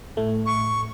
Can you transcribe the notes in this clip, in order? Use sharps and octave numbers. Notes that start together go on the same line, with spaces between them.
A2 A3
C#6